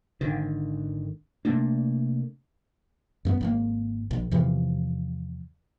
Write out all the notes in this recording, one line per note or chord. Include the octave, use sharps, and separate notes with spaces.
G#1 D3 D#3
C3 A3 A#3 D4
F#2 A3 B3
G#1 B2 A#3
A#1
E2 C3 E3 F3